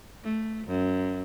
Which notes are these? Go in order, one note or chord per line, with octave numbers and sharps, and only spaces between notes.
A3
F#2